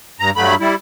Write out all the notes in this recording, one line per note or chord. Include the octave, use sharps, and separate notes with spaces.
G2 A#5
G2 F#3 A3 B5
G3 E4